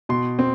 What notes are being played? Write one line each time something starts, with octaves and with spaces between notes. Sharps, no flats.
B2 C6
C4